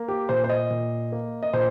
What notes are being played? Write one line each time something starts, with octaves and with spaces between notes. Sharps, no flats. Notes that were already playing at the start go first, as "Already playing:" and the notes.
Already playing: A#3
G4
A#2 C5
C5
D#5
A#2
A#3
D#5
A#2 C5